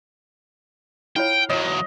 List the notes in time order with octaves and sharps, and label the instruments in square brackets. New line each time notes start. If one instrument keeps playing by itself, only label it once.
[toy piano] E4 F4 C#5 [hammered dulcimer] F5 [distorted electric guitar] G5
[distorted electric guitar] E2 F#3 [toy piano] C#5 [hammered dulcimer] D#5